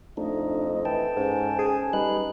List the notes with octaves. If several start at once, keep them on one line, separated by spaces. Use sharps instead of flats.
F2 A3 D4 D#4 D#5
E3 A4 G5 A5
G#2 C#4
G#4
G3 D#4 B4 F#6